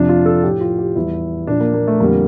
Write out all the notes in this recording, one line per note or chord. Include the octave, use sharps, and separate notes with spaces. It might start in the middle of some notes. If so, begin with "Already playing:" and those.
Already playing: F2 C3 F3 D4
F4
A4
A2 F3 G4
F4
G4
E2 E3 G3 E4
A#2 F3 D4
A#3
A#3
A3
F2 D3 G3 A#3